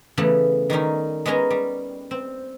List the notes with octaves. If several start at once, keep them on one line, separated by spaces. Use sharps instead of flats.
C#3 E3 A3 B3
D#3 G3 C#4 D#4
G#3 B3 C#4 D#5 G#5 A#5
G3
C4